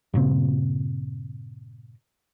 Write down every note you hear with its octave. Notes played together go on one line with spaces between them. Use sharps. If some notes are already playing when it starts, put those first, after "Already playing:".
G2 A#2 C#3 C4